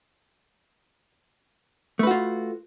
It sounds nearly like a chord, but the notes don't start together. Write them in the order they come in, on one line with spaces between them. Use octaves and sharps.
A3 B4 F#4 F4